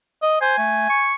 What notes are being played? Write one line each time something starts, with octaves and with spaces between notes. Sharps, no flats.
D#5
C5 G#5
A3
C#6